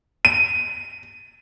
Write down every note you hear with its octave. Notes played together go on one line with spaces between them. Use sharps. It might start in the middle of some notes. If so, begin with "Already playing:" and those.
D#7